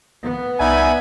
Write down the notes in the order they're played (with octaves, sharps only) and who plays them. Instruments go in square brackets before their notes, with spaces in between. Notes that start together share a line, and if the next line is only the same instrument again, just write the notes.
[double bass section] B3
[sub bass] C2 [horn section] D#4 D5 G#5 [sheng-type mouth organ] E5 F#5 B5